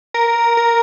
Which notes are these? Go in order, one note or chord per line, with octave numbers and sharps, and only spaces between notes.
A#4
A#4